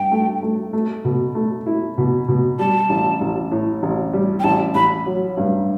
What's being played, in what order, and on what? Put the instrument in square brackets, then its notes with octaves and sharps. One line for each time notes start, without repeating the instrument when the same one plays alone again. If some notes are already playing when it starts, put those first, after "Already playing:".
Already playing: [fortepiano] G2 [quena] G5
[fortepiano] A3
A3
A3
B2
A3
E4
B2
B2
[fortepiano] G3 [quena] A5
[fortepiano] A1
A1
A2
A1
G3
[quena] G5
[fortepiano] A1 [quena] A5
[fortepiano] A1 [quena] B5
[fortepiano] F#3
G2